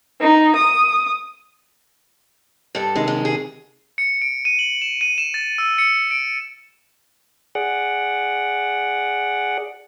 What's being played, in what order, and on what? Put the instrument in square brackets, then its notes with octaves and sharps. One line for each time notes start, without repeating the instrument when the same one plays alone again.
[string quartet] D#4
D#6
[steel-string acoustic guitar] G2 A4
[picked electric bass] C3 D#3 [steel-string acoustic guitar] G#3
[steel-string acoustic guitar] G#3
G#4
[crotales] C#7
D7
D#7
F#7
E7
D#7
E7
A6
E6
C#7
D7
[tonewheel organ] G#4 D5 F#5